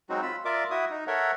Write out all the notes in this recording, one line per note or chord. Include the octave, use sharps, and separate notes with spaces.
F#3 G#3 C4 D#4 F#4
F4 B5 E6
F4 A#4 D5 E5 D6
E4 F#4 E5 D#6
D#4
A4 A#4 C#5 E5 F#5